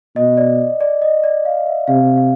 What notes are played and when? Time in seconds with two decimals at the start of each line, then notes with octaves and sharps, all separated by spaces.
0.16 B2 D#5
0.37 D5
0.80 D5
1.02 D#5
1.24 D5
1.45 F5
1.67 E5
1.88 C3 F5
2.17 F5